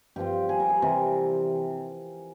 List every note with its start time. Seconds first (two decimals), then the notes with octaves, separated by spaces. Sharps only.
0.16 G2 F3 C4 G4
0.49 G#4
0.60 A#4
0.69 G#4
0.82 C3 E3 G3